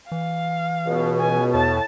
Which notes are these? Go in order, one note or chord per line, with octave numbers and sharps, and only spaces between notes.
E3 F5
C#2 B2
G#5
E2 A2 A5